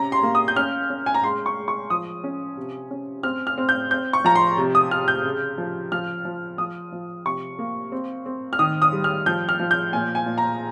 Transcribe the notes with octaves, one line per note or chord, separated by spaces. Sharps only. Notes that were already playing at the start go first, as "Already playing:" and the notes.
Already playing: C3 C#4 A#5
C6
A#3
D#6
G6
C#4 F6
C#4
G#5
A#5
G#3 C6
C#6
G#3
C#6
F3 D#6
C#4
C3
C#4
C4 F6
F6
C4
G6
C4 G6
C#6
F3 A#5
C6
C3
D#6
C3 F6
G6
C#3
F3
F3 F6
F3
F3 D#6
F3
C3 C#6
A#3
C4
C4
F6
D#3 D#6
D#6
G3
F6
F3 G6
F6
F3
G6
A#2 G#5
G#5
A#2
A#5